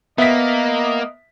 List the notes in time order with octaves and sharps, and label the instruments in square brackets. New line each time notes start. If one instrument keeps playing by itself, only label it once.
[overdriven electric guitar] A#3 [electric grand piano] B3 [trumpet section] D#5 [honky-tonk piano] E5 B6